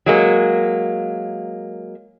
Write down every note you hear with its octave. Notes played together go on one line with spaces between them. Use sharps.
F#3 G#3 A#3